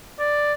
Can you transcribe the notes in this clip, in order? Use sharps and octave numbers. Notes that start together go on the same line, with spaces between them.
D5